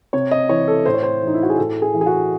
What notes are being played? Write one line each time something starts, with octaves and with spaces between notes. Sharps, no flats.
C3 C#5
D#5
E3 C#5
A4
A2 C5
C#5
C5
E3 D#4
E4
F#4
G#4
A2 A4
G#4
E3
G#4
F#4